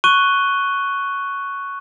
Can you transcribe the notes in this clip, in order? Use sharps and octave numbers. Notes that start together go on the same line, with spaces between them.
C#6 F#6 D#7 G7